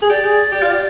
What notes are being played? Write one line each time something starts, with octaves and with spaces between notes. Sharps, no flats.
G#4
G4 D5
G#4
G4
F4
G4